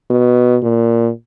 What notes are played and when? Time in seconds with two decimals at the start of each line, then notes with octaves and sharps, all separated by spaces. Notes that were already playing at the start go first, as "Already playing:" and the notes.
0.10 B2
0.63 A#2